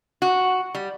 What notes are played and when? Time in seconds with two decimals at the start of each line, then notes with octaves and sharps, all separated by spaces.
0.22 F#4
0.75 G3